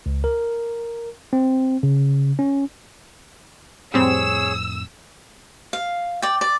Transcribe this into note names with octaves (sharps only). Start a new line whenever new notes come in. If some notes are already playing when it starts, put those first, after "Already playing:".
C#2
A#4
C4
C#3
C#4
F2 A2 G3 C4 G#4 C#5 E6
F5
D5 G5
D5